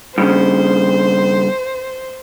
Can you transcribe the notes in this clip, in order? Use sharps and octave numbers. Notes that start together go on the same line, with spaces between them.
G2 A#2 C#3 C5